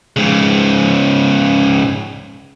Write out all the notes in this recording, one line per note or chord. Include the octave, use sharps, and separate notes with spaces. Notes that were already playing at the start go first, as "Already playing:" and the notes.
G#2 C#3